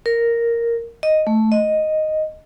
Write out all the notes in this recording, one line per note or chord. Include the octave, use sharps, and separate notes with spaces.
A#4
D#5
A3
D#5